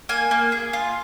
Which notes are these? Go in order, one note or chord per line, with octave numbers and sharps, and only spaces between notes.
A#3 G#5
A#3
G#4
F4